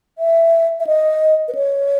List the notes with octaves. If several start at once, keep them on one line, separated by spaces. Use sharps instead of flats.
E5
E5
D#5
B4
C#5